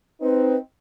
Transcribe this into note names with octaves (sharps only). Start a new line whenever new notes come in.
C4 D#4 B4